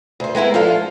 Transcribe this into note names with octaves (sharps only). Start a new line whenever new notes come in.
D2 C5
G#3 B3 E4 A#4
F3 D4 F4 A4 F5